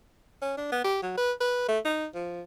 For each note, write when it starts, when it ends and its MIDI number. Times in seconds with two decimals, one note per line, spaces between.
0.42 0.56 61
0.57 0.69 62
0.72 0.82 59
0.84 1.01 67
1.02 1.14 54
1.18 1.32 71
1.40 1.67 71
1.68 1.79 57
1.85 2.07 63
2.15 2.42 53